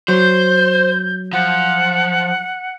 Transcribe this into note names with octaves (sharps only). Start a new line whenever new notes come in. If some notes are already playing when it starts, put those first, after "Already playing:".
F#3 C5 G6
F3 F#5